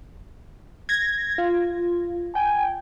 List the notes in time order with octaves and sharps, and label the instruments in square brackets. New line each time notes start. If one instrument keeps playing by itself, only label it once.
[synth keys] G#6 A#6
F4
[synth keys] G5 [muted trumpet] G#5